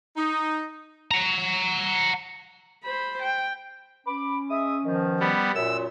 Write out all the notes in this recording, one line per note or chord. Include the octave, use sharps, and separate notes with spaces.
D#4
F#5 A#5
C5 B5
G5
C#4 B5 D6
G#3 E5 D#6
B2 D#3 F3
G3 B3
F#2 A#2 E6